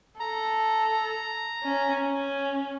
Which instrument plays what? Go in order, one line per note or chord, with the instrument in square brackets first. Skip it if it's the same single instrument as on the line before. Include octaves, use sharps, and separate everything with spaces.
[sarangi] A4 [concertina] A#5
[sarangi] C#4
C#4